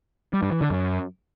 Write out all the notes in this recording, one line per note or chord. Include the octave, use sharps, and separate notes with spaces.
G3
G2
E3
D3
F#2